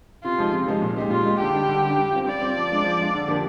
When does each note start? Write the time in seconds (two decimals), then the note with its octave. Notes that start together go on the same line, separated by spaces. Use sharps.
0.23 C3 F4
0.38 F3 G#3 D#4
0.53 C3
0.67 F3 G#3 D#4
0.82 A#2
0.96 G#3 D#4 G4
1.10 A#2 F4
1.25 G#3 D#4 G4
1.40 D3 G4
1.55 G3 D4
1.69 D3
1.83 G3 D4
1.97 G3
2.12 C4 F4
2.27 G3 D5
2.41 C4 F4
2.56 F3
2.70 G#3 D4 F4
2.84 F3
2.99 G#3 D4 F4
3.14 D3
3.28 F3 A#3 D4 G4